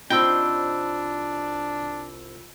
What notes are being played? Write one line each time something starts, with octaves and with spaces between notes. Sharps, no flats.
C2 C4 D4 D#4 F4 G5 B5 E6